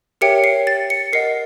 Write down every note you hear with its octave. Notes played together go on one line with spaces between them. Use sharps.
G4 A#4 C#5 E5 G5 C#7
C7
A6
C#7
A#4 D#5 F#5 C7